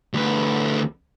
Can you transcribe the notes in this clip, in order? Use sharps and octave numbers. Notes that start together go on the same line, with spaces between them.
D2 B4